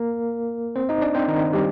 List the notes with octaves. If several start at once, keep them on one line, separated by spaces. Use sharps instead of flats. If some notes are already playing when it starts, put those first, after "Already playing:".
Already playing: A#3 A#4
C4 C5
D#4 D#5
D4 D5
C4 C5
D#3 D#4
G3 G4